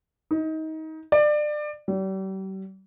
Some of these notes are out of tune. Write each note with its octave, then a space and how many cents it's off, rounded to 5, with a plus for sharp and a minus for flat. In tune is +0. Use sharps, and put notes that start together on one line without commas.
D#4 +25
D5 +25
G3 -40